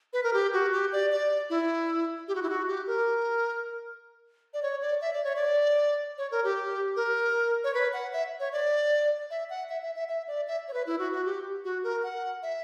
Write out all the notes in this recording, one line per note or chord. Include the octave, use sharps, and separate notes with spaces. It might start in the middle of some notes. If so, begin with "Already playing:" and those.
B4
A#4
G4
F#4
G4
D5
D5
E4
G4
F#4
E4
F#4
G4
A#4
D5
C#5
D5
E5
D5
C#5
D5
C#5
A#4
G4
A#4
C#5
B4
F#5
E5
C#5
D5
E5
F#5
E5
E5
E5
E5
D5
E5
C#5
B4
E4
F#4
F#4
G4
F#4
A#4
F#5
E5